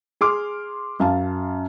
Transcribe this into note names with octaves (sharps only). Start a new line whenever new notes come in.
G#4 C6 D6 F6
F#2 F5 A5